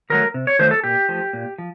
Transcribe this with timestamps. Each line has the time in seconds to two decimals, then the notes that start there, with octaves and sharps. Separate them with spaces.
0.10 D#3 F#3 A3 A#4
0.34 C3
0.47 C#5
0.59 D#3 F#3 A3 C5
0.71 A4
0.84 A#2 G4
1.09 F3 A3
1.33 A#2
1.58 F3